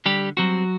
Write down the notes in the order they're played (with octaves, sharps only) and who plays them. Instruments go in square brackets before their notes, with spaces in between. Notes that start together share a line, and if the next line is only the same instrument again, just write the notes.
[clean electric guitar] D3 G3 G4
F#3 G3 C4 F#4